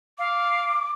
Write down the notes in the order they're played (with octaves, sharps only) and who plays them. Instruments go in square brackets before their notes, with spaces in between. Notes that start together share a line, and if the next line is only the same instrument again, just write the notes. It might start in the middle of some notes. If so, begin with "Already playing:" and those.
[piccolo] F5 [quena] D6